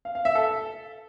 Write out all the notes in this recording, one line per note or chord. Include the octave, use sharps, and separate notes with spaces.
F5
F5
E5
A4